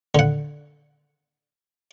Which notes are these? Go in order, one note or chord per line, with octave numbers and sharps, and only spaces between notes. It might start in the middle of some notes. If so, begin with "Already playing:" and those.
D3 F#5